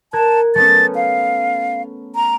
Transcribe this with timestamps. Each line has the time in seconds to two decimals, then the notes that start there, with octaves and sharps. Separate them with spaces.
0.13 A#4 A5 F#6 G#6
0.55 A3 B3 C#4 A6
0.96 F5
2.15 A#5